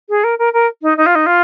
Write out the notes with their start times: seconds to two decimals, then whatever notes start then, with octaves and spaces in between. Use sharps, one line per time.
0.09 G#4
0.24 A#4
0.39 A#4
0.53 A#4
0.83 D#4
0.97 D#4
1.06 F4
1.15 D#4
1.26 F4